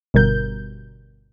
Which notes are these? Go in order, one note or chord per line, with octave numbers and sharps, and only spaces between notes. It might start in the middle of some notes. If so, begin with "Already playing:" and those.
G1 B2 G3 A#4 G6